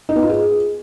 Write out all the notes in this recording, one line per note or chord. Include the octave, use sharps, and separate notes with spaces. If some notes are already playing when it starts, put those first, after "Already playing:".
D#4
B3
F4
G#4